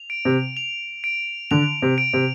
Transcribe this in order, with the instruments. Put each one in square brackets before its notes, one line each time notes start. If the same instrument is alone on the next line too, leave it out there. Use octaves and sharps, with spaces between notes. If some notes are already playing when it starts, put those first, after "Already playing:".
Already playing: [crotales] F7
D7
[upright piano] C3
[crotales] F7
D7
[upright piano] D3 [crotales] F7
[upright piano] C3
[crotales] D7
[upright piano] C3